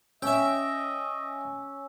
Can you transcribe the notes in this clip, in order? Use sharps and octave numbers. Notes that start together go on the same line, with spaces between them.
C#4 D#5 E5 G5 E6